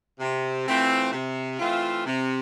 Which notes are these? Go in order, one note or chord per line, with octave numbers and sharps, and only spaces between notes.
C3
E3 A3 C4 F4
C3
E3 A3 C4 F4
C3